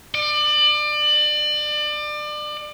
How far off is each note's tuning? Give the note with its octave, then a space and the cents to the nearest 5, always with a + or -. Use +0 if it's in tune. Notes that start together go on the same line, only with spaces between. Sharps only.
D5 +30